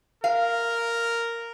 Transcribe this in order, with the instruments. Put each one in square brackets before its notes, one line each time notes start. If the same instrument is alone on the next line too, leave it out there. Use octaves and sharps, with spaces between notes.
[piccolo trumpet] A#4 [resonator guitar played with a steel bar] F5